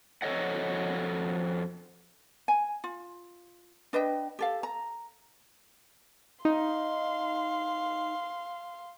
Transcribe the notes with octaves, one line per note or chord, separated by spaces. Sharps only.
F2 F#4 A4 C#5 D#5 F#5
G#5
F4
D4 B4 D#5 G5
G4 A4 F5
A#5
D#4 F5 C6